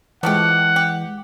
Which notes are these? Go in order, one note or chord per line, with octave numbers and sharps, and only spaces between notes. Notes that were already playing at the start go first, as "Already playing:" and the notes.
E3 F3 G#3 A3 G4 F#5
G4